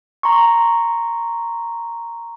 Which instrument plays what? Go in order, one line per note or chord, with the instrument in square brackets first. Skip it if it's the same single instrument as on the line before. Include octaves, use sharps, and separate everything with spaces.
[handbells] A#5 C6 C#6